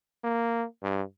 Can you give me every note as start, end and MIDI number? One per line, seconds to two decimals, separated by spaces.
0.24 0.65 58
0.83 1.03 43